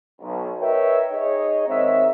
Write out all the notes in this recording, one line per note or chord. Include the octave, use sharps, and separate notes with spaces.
B1
A#4 B4 C#5 D#5 E5 G5
D#4 G#4 C#5 D#5
G#2 D#3 C4 C#5 E5